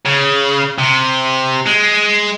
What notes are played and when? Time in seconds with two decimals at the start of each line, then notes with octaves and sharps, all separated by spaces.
0.06 C#3
0.78 C3
1.67 G#3